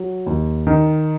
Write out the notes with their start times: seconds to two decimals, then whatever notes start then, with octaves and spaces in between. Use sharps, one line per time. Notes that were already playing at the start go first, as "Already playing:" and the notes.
Already playing: F#3
0.26 D#2
0.67 D#3